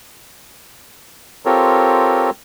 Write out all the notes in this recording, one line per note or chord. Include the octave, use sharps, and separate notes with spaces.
C4 F4 G4 A4 A#4 C#5